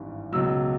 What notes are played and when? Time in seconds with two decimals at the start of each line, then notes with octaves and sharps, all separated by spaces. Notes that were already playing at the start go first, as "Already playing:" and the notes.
Already playing: G#1 G2 E3 G3
0.32 C#2 B2 F#3 E6